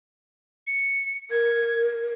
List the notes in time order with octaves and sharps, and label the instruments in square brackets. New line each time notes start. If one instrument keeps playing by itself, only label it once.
[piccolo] C#7
[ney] A#4 [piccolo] G#6